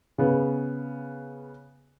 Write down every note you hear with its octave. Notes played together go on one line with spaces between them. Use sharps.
C#3 B3